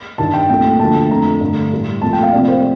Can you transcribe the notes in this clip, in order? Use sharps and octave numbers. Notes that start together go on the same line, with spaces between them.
G2 D#3 G3 A5
G5
C2 A#2 A3 G5
D2 D3 F3 A3 A5
F2 D3 A3 A#5
G2 D3 A3
A2 G3
C2 A#2 F3 A3 A5
G5
F5
C2 C3 F3 A3 D5
C5